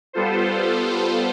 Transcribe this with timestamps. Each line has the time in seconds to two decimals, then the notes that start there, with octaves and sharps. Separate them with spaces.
0.13 G3 B3 F4 A4 C5